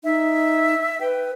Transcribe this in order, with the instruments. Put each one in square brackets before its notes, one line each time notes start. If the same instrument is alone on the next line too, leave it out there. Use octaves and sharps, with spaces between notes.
[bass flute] D#4 [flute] E5
[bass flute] B4 [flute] G5